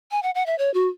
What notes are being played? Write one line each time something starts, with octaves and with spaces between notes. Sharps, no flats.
G#5
F#5
F#5
E5
C#5
F#4